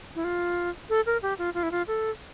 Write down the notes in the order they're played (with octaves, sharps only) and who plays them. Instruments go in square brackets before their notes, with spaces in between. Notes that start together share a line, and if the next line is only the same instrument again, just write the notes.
[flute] E4
F4
A4
A#4
G4
F4
F4
E4
F4
A4